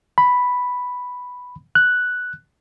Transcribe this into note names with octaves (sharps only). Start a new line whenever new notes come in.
B5
F#6